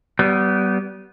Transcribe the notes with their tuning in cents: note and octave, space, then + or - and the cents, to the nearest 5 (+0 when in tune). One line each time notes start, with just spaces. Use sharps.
G3 -30 B3 +0